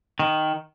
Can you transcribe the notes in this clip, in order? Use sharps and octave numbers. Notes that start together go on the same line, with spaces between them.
D#3